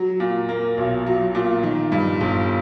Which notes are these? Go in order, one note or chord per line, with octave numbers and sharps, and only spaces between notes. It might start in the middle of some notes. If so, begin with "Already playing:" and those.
Already playing: F#3
A#2
A#3
B1
F#3
A#2
D#3
G2
G1